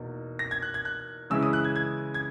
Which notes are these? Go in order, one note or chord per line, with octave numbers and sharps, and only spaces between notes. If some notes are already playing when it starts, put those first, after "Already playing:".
Already playing: E2 B2 A#3 D#4
A#6
G#6
F#6
G#6
F#6
C#3 E3 G#3 C#4 E4 E6
D#6
F#6
G#6
G#6
G#6